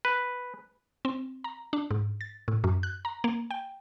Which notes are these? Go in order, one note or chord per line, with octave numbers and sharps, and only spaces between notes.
B4
C4
A#5
D4
G#2
A6
A2
F#2
F#6
A#5
A#3
G5